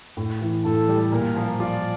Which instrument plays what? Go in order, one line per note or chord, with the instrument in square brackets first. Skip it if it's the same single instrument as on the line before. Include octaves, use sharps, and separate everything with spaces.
[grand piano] A2
E3
[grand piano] A2 [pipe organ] A4
[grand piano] G3
[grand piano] A#2 [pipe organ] A#4
[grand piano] F3
[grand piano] F4 [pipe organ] D5